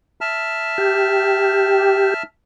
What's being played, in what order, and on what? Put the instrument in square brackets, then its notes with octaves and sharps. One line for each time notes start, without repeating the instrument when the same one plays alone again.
[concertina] E5 A5 F6
[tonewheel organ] G4